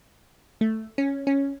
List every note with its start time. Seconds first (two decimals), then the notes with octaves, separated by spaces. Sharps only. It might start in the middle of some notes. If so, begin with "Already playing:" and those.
0.61 A3
0.98 C#4
1.27 C#4